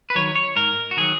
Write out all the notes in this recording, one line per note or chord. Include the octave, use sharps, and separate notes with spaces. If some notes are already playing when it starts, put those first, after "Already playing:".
B4
D#3 F#3 C#5
C#5
G#2 A#4
F#4
D#3 F#3 G#4